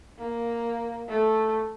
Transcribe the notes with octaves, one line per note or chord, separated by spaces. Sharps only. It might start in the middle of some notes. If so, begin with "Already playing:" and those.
A#3
A3